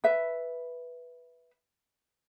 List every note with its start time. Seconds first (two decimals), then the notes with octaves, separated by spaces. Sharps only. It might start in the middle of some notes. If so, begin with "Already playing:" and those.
0.04 B4 E5